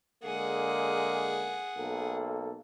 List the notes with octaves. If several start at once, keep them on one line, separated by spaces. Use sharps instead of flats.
D3 G#3 A#3 G#4 F#5
B1 A#3 A4